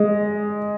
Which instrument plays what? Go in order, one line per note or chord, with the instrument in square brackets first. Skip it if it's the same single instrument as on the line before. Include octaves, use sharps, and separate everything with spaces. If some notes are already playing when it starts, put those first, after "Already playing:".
Already playing: [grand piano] G#3